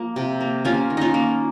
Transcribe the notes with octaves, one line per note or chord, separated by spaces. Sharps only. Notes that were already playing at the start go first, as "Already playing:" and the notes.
Already playing: F3 A#3
C3
A#3
A#3 C#4 F4
D#3
C#4 D#4 F4
A#3